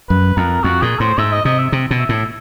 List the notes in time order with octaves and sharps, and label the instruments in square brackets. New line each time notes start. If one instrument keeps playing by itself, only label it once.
[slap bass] F#2 [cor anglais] B4
[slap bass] F2 [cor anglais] A#4
[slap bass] F2 [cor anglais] F#4
[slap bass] A#2 [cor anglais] G#4
[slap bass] A2 [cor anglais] C5
[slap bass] G#2 [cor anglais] E5
[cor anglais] D#5
[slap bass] C3 [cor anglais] D#5
[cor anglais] E5
[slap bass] C3
B2
[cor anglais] E5
[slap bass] A2